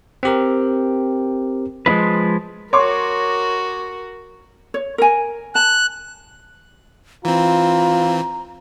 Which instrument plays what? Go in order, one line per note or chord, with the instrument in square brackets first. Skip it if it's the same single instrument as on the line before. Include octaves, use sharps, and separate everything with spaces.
[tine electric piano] C4 G4 A#4
[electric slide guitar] F3 G#3 C4 E4 B4
[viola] F#4 A#4 [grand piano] C#5 C6 D6
[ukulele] C#5
A#4 G#5
[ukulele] A5 [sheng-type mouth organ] F#6
[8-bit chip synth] E3 C4 [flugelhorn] F4 [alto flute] A#5